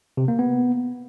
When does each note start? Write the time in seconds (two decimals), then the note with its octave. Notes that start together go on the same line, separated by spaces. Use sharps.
0.17 C3
0.28 A#3
0.39 B3